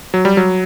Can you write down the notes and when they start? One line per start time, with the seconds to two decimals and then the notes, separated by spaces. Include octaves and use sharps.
0.14 F#3
0.25 G3
0.37 F#3